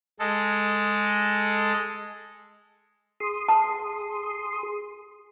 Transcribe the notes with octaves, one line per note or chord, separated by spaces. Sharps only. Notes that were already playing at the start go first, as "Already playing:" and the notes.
G#3 A4
G#4 C6 D#6
A5